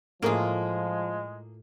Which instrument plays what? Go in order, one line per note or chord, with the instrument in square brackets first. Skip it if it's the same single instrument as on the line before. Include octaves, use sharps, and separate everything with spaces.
[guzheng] A2 F4 [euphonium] F3 [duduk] G#3 [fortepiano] A#3 G#4